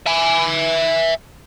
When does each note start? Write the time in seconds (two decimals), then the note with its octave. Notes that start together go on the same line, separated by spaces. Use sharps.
0.06 E5 G#5